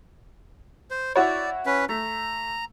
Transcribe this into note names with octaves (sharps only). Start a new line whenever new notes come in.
C5
E4 F#4 C#5 D5
C#4 B4
A3 A#5